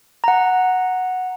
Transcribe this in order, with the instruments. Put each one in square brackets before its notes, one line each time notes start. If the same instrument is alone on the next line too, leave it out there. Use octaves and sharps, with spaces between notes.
[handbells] F#5 A#5